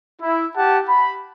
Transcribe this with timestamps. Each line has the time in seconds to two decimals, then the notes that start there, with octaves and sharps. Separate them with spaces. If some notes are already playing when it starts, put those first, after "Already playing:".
0.21 E4
0.55 G4 F#5 A5
0.87 B5